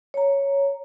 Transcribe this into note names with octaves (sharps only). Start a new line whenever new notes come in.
C#5 A#5